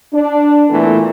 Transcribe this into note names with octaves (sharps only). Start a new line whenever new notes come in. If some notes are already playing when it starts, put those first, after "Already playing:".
D4
A#2 E3 A3 B3 A4